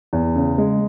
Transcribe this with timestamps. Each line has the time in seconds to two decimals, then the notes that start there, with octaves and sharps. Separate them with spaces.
0.13 E2
0.36 C#3
0.58 G#3